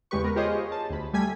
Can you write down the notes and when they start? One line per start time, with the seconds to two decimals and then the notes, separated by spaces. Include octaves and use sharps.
0.11 E2 C#3 G#3 G4 B4 C#6
0.24 B3 A#4 B4
0.36 F4 G4 G#4 C5 C#5 D#5
0.72 A5
0.90 D2 B5
1.13 G3 A3 G#5 G#6 B6